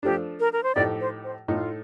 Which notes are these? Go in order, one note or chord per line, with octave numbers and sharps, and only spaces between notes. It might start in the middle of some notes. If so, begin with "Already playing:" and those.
F3 A3 D4 G4
A#4
A#4
C5
A2 F3 A3 D#4 G4 D5
C5
C5
A2 A3 D#4 F4